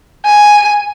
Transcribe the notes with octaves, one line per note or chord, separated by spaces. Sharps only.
G#5